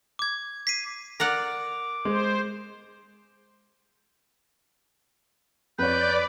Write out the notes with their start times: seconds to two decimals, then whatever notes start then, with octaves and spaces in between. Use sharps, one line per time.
0.19 D6 G#6
0.67 B6 C7 D#7
1.20 A#4 D5 F#5 D6
2.05 G#3 C5
5.79 F2 B4 C#5 D5 G6